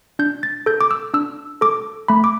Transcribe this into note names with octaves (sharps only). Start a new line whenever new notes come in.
D4 G6
A6
A4 G6
D6
E6
D4 E6
A4 D6
A3 B5
D6